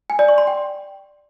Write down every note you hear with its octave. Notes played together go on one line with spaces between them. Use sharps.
G#5
D5
C#6
C6
G5